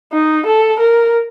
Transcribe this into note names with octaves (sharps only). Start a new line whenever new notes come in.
D#4
A4
A#4